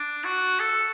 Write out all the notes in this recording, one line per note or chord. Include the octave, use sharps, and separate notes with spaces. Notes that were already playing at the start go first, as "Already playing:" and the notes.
Already playing: D4
F#4
A4